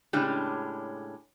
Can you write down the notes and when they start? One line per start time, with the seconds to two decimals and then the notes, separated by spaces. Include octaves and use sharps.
0.13 A2 C#3 G#3 C#4 D4 G4